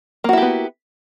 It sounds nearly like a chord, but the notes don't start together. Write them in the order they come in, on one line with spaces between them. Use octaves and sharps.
A#3 F#4 E4 G4 B3